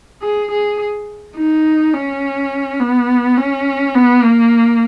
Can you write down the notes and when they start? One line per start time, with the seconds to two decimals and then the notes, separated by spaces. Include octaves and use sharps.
0.22 G#4
0.51 G#4
1.36 D#4
1.94 C#4
2.80 B3
3.37 C#4
3.95 B3
4.24 A#3